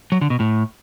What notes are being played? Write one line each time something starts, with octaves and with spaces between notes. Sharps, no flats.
F#3
D3
B2
A2